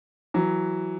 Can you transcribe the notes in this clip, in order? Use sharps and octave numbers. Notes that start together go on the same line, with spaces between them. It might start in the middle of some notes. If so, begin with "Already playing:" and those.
E3 F#3